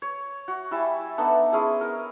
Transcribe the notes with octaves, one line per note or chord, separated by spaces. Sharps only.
C#5
F#4
G3 E4 G#5 A5
A3 B3 D4 D#4
G#3 C#4 E4 G#4
A#4